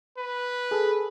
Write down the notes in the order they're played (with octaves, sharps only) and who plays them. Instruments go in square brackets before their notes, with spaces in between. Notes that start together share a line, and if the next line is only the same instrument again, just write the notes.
[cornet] B4
[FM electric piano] G#4 A4